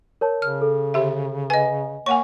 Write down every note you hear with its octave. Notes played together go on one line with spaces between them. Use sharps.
A#4 C#5 A5
C#3 F6
A4
D3 G4 E5
B4 D#5 G#5
A#3 C#5 F#5 G#5 C#6